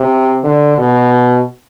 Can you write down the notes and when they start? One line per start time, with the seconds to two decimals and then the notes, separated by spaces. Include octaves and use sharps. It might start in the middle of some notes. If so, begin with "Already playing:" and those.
Already playing: C3
0.44 D3
0.78 B2